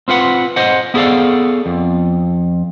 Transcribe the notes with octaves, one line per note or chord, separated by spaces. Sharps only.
C4 F4 B4 F#5
C5 D#5 F#5
B3 E4 G#4 A4 D5 F5
F2